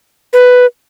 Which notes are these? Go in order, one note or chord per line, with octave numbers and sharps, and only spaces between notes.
B4